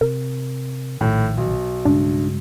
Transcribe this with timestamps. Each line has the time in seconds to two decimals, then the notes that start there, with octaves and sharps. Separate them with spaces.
0.01 C3 A#4
1.01 A#1 A2 D#3
1.37 B1
1.85 G2 C#3 G#3 D4